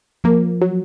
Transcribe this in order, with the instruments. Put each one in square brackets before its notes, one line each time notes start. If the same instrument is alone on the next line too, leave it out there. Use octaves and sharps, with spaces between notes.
[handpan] F3 [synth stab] A#3
[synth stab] F#3